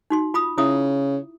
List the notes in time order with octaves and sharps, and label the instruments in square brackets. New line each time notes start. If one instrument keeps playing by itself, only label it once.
[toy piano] D#4 F#4 C6
F4 B5 D#6
[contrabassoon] C#3 [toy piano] E4 E5 D#6